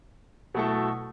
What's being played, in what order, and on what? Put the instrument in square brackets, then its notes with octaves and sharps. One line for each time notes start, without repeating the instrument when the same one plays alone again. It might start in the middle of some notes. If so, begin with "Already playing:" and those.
[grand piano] B2 F#3 A3 E4 A4